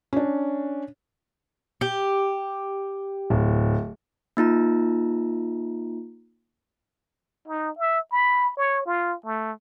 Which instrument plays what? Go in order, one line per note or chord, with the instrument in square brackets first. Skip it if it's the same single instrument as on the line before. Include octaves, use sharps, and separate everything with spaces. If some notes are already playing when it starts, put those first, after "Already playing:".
[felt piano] C#4 D4
[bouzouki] G4
[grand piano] D1
[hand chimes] A#3 D#4 F4 A#5
[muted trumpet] D#4
E5
B5
C#5
F4
A3